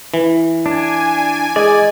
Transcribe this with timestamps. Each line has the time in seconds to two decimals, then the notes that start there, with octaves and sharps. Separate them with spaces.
0.14 E3
0.66 D4 G#5
1.56 G#3 D5